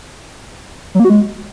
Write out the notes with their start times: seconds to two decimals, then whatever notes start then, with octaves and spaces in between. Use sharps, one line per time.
0.95 F#3
1.00 A#3
1.05 F#4
1.10 G#3